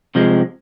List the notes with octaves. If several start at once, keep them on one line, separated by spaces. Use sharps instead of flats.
C3 F3 G#3